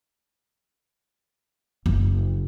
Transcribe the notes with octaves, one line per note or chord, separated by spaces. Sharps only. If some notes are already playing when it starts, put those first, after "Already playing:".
F#1